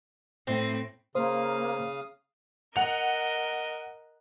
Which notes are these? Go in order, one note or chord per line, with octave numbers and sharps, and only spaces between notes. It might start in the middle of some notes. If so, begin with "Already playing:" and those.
A2 C4
C#3 A#3 C5 F5 D#6
A#4 D#5 F#5 F7